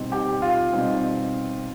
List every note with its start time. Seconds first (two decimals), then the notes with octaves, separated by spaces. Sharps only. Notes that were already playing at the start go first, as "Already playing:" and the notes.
Already playing: B2 G3 C4 D#4
0.12 G4 G5
0.42 F4 F5
0.73 B2 G3 C4 D#4